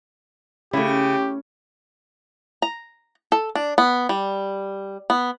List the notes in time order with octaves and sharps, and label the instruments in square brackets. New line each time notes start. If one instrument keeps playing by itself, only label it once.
[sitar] C#3 [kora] A3 E4 [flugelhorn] G4
[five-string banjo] A#5
A4
D4
B3
G3
B3